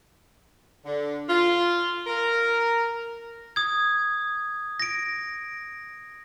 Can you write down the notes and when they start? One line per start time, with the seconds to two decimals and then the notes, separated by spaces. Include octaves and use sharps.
0.85 D3
1.28 F4
2.07 A#4
3.56 D#6 G#6
4.80 A#6 D7